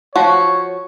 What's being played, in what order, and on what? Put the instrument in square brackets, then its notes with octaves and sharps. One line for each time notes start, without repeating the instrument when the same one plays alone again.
[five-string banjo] F3 F#4 [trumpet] C#5